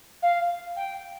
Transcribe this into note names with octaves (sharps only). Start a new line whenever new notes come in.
F5
G5